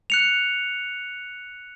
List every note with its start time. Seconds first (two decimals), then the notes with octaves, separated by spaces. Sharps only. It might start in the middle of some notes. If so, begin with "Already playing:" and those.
0.10 F#6 C#7 F7